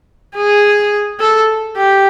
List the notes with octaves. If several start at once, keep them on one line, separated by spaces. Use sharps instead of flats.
G#4
A4
G4